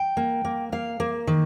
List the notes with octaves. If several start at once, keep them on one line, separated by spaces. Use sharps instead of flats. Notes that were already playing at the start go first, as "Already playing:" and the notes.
Already playing: G5
A#3
A#3
A#3 F5
A#3
D#3